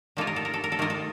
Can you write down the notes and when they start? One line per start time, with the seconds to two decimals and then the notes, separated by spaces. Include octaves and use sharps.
0.17 D#3 A#3 F4 A4
0.27 A#4
0.36 A4
0.45 A#4
0.54 A4
0.64 A#4
0.72 A4
0.79 D#3 A#3 F4 A#4
0.90 A4